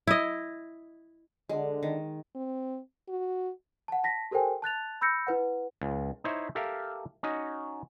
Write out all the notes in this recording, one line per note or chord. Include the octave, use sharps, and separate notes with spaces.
E4 D#5
D3 G#3
D#3
C4
F#4
F#5 A5
A5 A#6 B6
G4 A4 A#4 C5 G5 G#5
A5 F#6 A6 F7
B5 E6 G6 A#6 C#7
E4 B4 F#5
C#2
D#4 E4 C5 C#5 E5
G4 A4 A#4 E5 F5
C#4 D#4 F#4 D#5